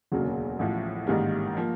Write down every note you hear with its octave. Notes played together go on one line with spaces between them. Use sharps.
E1 D2 C#3 F#3 A#3
A1 A2 F3
A1 G#2 D#3 G3 A#3
F3 A#3